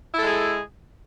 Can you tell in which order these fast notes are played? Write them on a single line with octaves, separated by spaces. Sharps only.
E4 A4 G#3 G#4